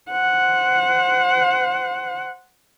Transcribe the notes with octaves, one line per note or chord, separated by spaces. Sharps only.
C5 F#5